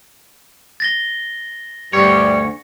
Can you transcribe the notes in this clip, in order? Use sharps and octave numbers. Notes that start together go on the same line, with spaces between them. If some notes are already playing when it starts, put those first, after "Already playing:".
A6 A#6 G7
D2 G2 G3 C#5